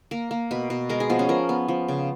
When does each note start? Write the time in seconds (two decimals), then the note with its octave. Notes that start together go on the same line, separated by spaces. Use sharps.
0.11 A#3 A#4
0.31 A#3
0.51 B2 B4
0.70 B2
0.89 G#3 A#4
1.00 G#4
1.10 F3 B3
1.19 C#4
1.29 F3 A#4
1.49 B3
1.68 F3
1.88 C#3